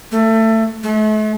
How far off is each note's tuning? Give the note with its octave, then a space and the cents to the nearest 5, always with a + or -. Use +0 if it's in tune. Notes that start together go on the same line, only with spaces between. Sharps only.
A3 +20
A3 -40